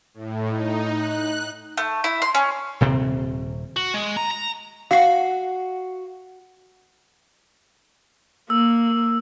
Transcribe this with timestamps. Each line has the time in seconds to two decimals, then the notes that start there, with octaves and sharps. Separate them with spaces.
0.14 A2
0.49 D#4
0.94 F#6
1.77 A3
2.04 E4
2.22 C6
2.35 C#4
2.81 D#1 C3 C4
3.77 F#4
3.94 G#3
4.17 A#5
4.31 A#5
4.91 F#4 F5 C7
8.50 A#3 E6